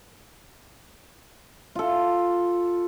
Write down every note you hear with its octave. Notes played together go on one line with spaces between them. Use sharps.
F4 A4